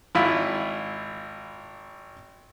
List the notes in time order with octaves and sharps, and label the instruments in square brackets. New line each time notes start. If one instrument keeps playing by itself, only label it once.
[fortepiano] G#1 E4 F4 E5